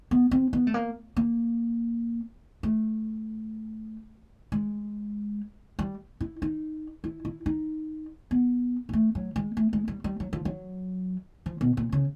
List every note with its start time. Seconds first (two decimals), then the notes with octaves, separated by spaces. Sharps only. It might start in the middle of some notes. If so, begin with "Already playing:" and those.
0.11 B3
0.31 C4
0.53 B3
0.67 A3
0.74 A#3
1.16 A#3
2.63 A3
4.52 G#3
5.79 G3
6.21 E4
6.42 D#4
7.04 E4
7.25 E4
7.46 D#4
8.31 B3
8.89 G#3
8.93 A3
9.15 F#3
9.36 G#3
9.57 A3
9.73 G#3
9.88 G3
10.04 G3
10.20 F#3
10.33 F3
10.45 F#3
11.46 F3
11.61 B2
11.77 A#2
11.92 C#3